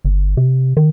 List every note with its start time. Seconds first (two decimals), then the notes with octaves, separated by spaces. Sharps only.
0.05 G1
0.37 C3
0.77 D#3